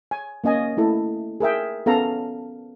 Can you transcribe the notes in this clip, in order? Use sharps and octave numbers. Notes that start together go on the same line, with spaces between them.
G#5
A#3 C#4 D#5 G#5
A3 E4 A4
G#4 A#4 E5 G5
B3 C#4 A4 F5 A#5